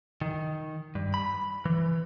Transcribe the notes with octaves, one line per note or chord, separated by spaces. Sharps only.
D#3
G2
B5
E3